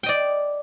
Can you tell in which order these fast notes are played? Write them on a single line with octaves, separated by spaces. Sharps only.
G5 D#5 D5